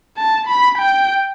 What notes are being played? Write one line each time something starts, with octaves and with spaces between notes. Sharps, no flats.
A5
B5
G5